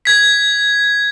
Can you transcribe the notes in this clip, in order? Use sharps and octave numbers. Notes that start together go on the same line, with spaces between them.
G#6 B6